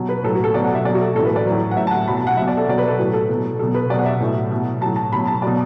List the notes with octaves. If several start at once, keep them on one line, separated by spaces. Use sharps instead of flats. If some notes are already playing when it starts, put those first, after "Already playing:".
Already playing: B2 F#3
B4
A2 F#3 A4
F#4
A4
B2 F#3 D5
F#5
E5
B2 F#3 D5
F#4
A4
A2 E3 A4
B4
D5
A2 F#3
F#5
A2 F#3 E5
A5
F#5
B2 F#3 B5
A5
F#5
B2 F#3 E5
D5
A4
B2 F#3 D5
B4
A4
A2 F#3 F#4
A4
B2 F#3
B2 F#3 A4
B4
B2 F#3 D5
F#5
E5
A2 F#3
B2 F#3
A2 F#3 A5
A5
B2 F#3 B5
A5
B2 F#3 D5